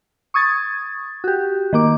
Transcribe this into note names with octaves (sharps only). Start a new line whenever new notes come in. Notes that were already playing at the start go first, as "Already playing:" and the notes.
C#6 D#6 G#6 A6
F#4 G4
D#3 A#3 D6